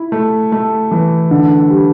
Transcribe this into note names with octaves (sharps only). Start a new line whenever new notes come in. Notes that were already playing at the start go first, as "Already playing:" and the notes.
Already playing: E4
A3
A3
E3
D3
G3